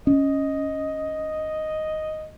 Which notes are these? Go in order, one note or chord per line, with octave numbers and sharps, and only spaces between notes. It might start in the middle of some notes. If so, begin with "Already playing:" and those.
C#4 D#5